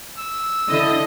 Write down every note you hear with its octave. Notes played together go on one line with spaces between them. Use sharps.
E6
D3 E4 D#5